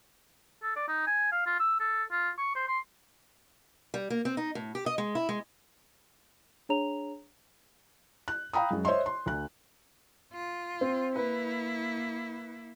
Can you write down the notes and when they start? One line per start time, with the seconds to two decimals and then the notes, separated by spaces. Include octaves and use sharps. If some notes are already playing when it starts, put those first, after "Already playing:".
0.63 A4
0.76 D5
0.88 D#4
1.07 G#5
1.32 F5
1.46 F4
1.60 E6
1.80 A4
2.11 F4
2.38 C#6
2.55 C5
2.68 C6
3.94 G3
4.10 A#3
4.25 C4
4.37 D#4
4.55 A2
4.75 G4
4.86 D#5
4.98 G#3
5.15 E4
5.29 G#3
6.69 D4 G#4 C#5 A#5 F7
8.28 F#6
8.53 F5 G5 A#5 B5 D#6
8.71 F#2 G#3
8.85 C5 C#5 D#5 E5 C6
9.06 C6
9.26 D2 F#6
10.33 F4
10.81 C4
11.16 A#3 E4 B4